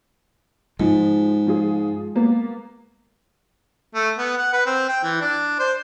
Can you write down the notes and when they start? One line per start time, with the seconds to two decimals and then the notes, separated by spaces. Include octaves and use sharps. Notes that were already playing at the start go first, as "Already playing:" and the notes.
0.80 G#2 F3 G#3
1.47 F3 F4 G#4
2.16 A#3 B3
3.94 A3
4.18 B3
4.37 F#5
4.53 B4
4.66 C4
4.89 G5
5.04 E3
5.21 D4
5.59 C5